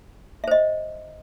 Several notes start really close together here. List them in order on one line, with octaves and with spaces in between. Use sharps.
E5 C5 D#5